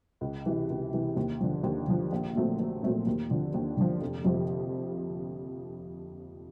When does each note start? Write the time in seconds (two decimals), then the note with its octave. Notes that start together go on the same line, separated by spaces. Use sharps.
0.21 C#2
0.46 C3 E3
0.70 C#2
0.93 C3 E3
1.17 D#2
1.41 D3 F3
1.63 D#2
1.88 D3 F3
2.12 A#1
2.35 A#2 F#3 A3 C4
2.60 A#1
2.83 A#2 F#3 A3 C4
3.07 D#2
3.30 D3 F3
3.54 D#2
3.77 D3 F3
4.01 F1
4.25 F2 C3 F3